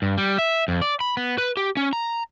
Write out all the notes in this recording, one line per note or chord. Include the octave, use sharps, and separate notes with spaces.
G2
G3
E5
F2
D5
B5
B3
B4
G4
C#4
A#5